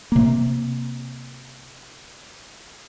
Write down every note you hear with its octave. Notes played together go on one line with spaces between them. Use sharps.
C3 A#3